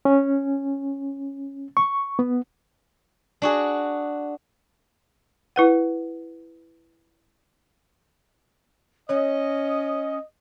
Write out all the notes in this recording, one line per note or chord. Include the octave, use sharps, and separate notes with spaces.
C#4
C#6
B3
D4 F#4 G#4
E4 B4 F#5
C#4 C#5 D#5